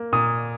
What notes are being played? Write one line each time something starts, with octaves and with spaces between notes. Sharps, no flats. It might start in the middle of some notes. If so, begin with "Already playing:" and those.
Already playing: A#3
A#2 D#6